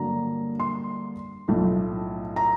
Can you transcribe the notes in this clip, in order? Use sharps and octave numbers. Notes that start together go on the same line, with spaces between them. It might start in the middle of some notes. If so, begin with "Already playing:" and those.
Already playing: G2 D3 F#3 A#3 A#5
C6
B1 A2 F3 A3
A#5